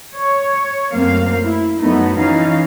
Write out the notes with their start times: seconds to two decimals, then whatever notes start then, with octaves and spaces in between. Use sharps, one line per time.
0.13 C#5
0.92 F#2 A3 A#3 C4 F5
1.43 E4
1.81 F#2 A3 B3 D#4
2.18 E3 C#4 D#4 F5